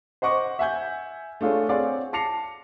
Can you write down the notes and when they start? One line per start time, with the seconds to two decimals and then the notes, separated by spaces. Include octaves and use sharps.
0.22 C5 D#5 F#5 C#6 D6
0.59 E5 F#5 G#5 G6
1.41 A3 D4 F4 G#4 C#5
1.69 C4 G#4 C#5 D5 F5 F#5
2.13 A5 D6 A#6 C7 C#7 F7